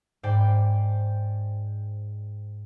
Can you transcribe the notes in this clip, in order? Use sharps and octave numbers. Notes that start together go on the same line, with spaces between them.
G#2 C5 D5 G5